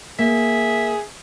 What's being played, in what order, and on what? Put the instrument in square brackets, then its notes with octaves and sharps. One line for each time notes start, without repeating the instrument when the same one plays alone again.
[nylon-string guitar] A#3 [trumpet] G#4 [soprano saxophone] E5